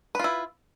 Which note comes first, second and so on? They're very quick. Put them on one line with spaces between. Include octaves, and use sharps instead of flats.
B4 F4 E4